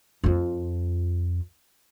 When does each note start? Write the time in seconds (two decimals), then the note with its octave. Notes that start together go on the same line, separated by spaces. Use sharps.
0.24 F2 F4